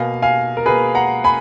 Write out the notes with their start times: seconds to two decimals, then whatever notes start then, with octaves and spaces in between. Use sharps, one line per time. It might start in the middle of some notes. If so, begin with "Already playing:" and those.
Already playing: B2 A#3 F5 G#5
0.22 F5 G#5
0.57 A#4
0.66 B2 A#3 G#4 B4
0.95 F#5 A#5
1.24 G#5 B5